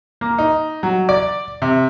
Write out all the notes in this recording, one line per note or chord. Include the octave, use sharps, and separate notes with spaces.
A#3
D#4
F#3
D5
C3